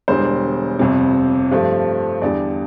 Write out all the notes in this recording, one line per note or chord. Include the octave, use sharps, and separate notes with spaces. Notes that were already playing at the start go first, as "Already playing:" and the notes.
E1 E2 D3 G3 C5
G1 F2 C3
G2 F3 A3
E2 D3 G3 D5